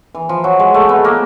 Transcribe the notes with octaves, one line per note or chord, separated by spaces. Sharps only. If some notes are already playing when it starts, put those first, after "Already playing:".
E3
F3
F#3
G#3
A3
B3
A#3